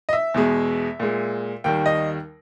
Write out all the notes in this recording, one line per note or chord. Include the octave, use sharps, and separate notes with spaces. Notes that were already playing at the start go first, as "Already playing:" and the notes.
D#5
E5
E2 B2 G#3
A#2 G#3
D#2 D#3 G3 G5
D#5